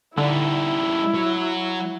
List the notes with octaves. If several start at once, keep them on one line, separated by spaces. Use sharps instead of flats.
D3 G3 D#4 E4
F#3